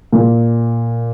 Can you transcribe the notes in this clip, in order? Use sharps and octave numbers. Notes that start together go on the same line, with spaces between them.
A#2